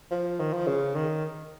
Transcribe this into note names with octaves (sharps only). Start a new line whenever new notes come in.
F3
D#3
F3
C#3
D#3